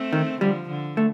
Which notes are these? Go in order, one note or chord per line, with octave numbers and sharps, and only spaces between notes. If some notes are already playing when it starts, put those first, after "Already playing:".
Already playing: A3 C4
D#3
D3 F3 G3
D3
A3